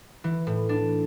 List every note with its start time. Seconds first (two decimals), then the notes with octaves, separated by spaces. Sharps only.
0.24 E3
0.47 A2
0.69 D4